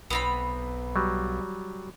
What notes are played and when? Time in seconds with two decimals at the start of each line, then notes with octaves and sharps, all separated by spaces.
0.10 B1 B3 C4 B5
0.96 F#3 G3